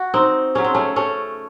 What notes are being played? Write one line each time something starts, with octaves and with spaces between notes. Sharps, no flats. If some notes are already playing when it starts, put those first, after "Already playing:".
Already playing: F#4
C4 D#4
C#3 F#3 C#4
C4
A3 C#4
A3 C#4